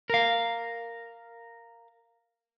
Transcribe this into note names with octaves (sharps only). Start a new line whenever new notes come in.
A#4 F5